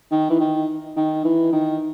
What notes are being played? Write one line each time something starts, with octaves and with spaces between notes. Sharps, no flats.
D#3
E3
D#3
D#3
E3
D#3